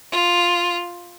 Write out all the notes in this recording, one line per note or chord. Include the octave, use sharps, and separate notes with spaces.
F4